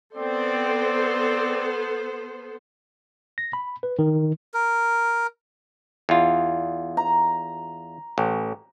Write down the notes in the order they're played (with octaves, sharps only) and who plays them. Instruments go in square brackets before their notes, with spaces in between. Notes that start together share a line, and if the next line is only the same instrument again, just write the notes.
[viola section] B3 A4 C5 [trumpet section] C4 D5
[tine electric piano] A#6
B5
B4
D#3
[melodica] A#4
[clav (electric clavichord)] E2 F4
[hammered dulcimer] A#5
[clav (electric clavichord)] A1